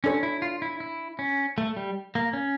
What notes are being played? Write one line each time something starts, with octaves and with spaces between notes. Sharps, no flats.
C#4 D4 A4 C#5
E4
F4
E4
E4
C#4
A3
G3
A#3
C#4